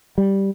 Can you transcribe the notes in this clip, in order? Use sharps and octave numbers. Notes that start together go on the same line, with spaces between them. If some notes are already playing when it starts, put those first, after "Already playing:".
G3